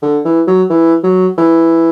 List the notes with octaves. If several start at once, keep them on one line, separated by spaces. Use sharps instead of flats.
D3
E3
F#3
E3
F#3
E3